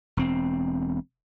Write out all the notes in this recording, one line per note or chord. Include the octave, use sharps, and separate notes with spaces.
E1 C4